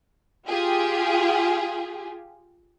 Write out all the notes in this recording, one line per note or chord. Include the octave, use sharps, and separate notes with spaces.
F4 G4 G#4